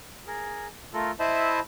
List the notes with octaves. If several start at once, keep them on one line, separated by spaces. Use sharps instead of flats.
G#4 A#4
A3 F4 A4 A#4
E4 C5 D#5 E5 A5 B5